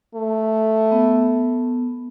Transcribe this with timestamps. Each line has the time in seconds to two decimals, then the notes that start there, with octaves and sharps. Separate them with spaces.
0.15 A3
0.92 B3